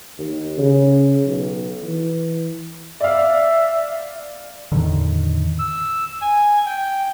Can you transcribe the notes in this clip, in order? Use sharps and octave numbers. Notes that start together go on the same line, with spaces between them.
D#2
C#3
B1
E3
D5 E5 F5
E2 A2 D3 D#3
E6
G#5
G5